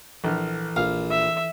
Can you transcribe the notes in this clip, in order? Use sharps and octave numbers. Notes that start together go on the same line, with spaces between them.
A#1 E3 A4 F6
A#1 F5
E5